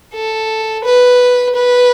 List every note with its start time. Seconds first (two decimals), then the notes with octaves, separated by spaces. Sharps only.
0.14 A4
0.84 B4
1.55 B4